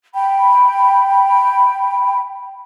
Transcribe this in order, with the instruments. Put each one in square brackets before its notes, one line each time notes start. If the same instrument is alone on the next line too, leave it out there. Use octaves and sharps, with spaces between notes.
[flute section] G5 B5